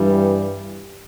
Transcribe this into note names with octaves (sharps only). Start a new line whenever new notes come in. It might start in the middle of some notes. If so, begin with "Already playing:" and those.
Already playing: G2 E3 G3